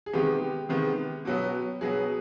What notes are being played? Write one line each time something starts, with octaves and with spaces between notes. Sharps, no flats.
G#4
C3 D#3 G#3 B3 G4
C3 D#3 G#3 B3
B2 F#3 B3
B2 F#3 B3 G#4